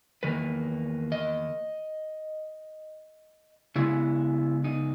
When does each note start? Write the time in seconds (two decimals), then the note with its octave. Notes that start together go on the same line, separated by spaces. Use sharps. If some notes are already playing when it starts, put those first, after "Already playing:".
0.23 E2 D#3 A#3 B4
1.12 D#5
3.76 C#3 G#3 B3 E4
4.64 D#4